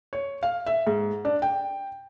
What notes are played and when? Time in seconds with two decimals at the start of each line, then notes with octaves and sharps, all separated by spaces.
0.13 C#5
0.43 F5
0.66 E5
0.87 G#2
1.25 D4
1.42 G5